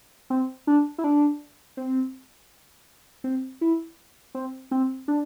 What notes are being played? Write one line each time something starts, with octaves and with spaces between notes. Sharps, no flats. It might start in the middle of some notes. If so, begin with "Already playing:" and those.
C4
D4
E4
D4
C4
C4
E4
C4
C4
D4